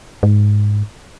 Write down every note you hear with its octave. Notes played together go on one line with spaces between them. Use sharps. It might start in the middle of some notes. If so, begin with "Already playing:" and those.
G#2